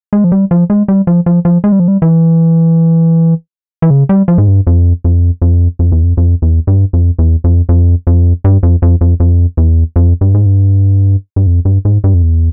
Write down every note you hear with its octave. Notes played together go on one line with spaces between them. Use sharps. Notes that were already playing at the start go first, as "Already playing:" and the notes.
G#3
F3
G3
F3
G#3
G3
F3
F3
F3
G#3
G3
F3
G3
E3
E3
C#3
G3
F3
G#2
G2
F2
F2
F2
F2
E2
F2
F2
E2
G2
F2
E2
F2
F2
F2
G2
F2
F2
F2
F2
E2
F2
G2
G#2
G2
G2
F2
G2
G#2
G2
F2
E2